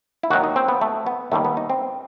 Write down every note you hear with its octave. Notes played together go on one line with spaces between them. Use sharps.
E4
D#2 D#3 F#3 F#4
D#4
C4
B3
A3
B3
D#2 D#3 G3 A3
B3
D#4
C4